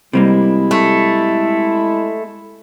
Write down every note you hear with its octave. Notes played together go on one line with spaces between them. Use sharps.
C3 G3 G#3 A#3 E4
A3